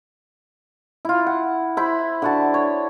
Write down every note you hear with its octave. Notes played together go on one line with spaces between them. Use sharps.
E4 F4
F#5
E4 C5 B5
D3 F#4 A5
C#5